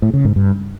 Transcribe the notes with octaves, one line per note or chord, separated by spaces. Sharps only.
A2
C#3
G#2
G2